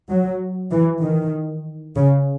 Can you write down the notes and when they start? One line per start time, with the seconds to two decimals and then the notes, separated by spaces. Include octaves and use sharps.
0.09 F#3
0.71 E3
1.01 D#3
1.95 C#3